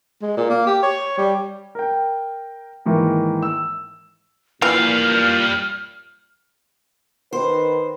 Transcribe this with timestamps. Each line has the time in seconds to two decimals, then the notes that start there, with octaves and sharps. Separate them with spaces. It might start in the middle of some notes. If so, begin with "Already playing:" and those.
0.22 G#3
0.37 A#2
0.50 A#3
0.67 G4
0.83 C#5
1.18 G3
1.75 A#4 G5
2.86 G#2 D#3 E3 A#3
3.42 E6
4.62 A#2 E3 G3 F5 F6
7.33 D#3 B4 C5